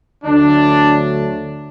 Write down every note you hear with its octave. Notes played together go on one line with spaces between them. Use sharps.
D2 D3 F#3 A3 D4